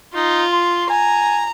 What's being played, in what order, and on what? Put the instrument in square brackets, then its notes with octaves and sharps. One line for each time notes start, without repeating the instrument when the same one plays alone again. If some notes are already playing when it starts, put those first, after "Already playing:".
[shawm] D#4 [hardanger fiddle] F4
[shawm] C6
[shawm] G#5 [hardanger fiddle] A#5